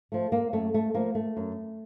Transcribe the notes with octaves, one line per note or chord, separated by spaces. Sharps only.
F3 A3
A#3
F#2 A3
A3
F3 A3 A#3
A3
F#2